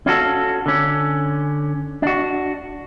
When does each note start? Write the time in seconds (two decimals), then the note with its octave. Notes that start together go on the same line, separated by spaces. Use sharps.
0.06 C#4 F4 F#4 A4
0.66 D3 C#4
2.02 D4 F#4